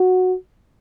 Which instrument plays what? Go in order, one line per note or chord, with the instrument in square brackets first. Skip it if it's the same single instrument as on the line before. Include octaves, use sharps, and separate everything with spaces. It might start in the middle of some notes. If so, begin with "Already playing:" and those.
Already playing: [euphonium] F#4